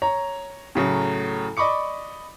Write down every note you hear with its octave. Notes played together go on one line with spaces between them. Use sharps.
C#5 A#5
A2 C#3 F#3 A3
D5 D#5 B5 C#6 D6 C#7